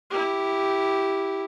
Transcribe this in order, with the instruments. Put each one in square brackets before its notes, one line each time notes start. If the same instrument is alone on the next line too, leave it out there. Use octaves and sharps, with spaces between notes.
[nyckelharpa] E4 G4